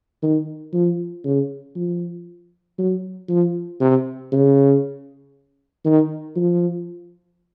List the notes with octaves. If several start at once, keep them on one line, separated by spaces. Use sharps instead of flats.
D#3
F3
C#3
F3
F#3
F3
C3
C#3
D#3
F3